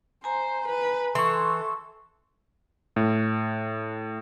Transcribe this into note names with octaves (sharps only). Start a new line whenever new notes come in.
C5 G#5 A#5
B4
E3 A4 C6 C#6
A2